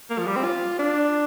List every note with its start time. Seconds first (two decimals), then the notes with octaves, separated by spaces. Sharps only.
0.10 A#3
0.19 F3
0.27 G3
0.36 C4
0.44 F4
0.79 D4